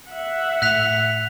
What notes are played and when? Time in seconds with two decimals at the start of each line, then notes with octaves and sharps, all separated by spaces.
0.11 E5 F#5
0.62 A2 F#6 B6 F7